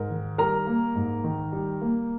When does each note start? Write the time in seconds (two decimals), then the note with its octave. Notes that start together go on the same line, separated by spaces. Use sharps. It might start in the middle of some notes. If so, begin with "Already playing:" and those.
Already playing: G#2 A#4
0.10 D#3
0.38 G3 A#4 A#5
0.67 A#3
0.95 G#2
1.24 D#3
1.52 G3
1.82 A#3